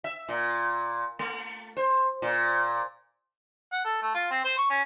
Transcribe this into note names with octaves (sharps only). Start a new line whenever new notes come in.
E5
A#2
A3
C5
A#2
F#5
A4
A3
F4
C4
C5
C#6
C#4